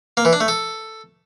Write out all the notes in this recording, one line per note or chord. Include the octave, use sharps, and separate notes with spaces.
A#3
E3
D4
A3
A4